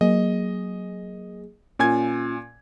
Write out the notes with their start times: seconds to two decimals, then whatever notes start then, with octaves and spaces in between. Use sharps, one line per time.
0.01 F#3 A#3 G#4 D#5
1.79 A#2 C#4 F4 G#5 G#6